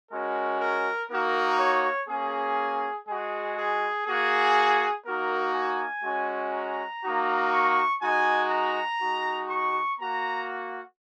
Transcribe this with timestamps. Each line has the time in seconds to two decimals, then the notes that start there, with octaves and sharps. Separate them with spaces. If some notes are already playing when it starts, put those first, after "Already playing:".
0.11 G#3 C#4 F#4 A#4
0.61 A#4
1.10 A#3 D#4 F#4 A#4
1.59 C#5
2.08 A#3 C#4 F#4 G#4
3.07 G#3 F#4 G#4
3.57 G#4
4.06 A#3 F#4 G#4
5.05 A#3 D#4 F#4 A#4
5.54 G#5
6.04 G#3 C#4 F#4
6.53 A#5
7.03 A#3 D#4 F#4
7.52 C#6
8.01 G#3 D#4 F#4 G#5
8.51 A#5
9.00 G#3 D#4 F#4
9.50 C#6
9.99 A#3 F#4 A#5